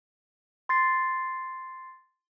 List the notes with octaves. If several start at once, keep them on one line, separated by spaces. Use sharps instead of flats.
C6 A6 C7